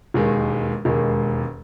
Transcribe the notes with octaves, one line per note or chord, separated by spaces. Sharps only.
E1 D#2 D#3 G#3
E1 D#2 D#3 G#3